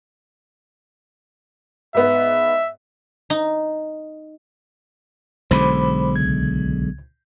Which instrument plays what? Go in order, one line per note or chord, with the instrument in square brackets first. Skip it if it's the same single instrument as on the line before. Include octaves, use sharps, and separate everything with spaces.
[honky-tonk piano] G#2 B3 [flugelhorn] E5
[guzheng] D#4
[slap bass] B1 D3 G#3 [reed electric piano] C5 B5 D6
[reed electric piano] C#2 G#6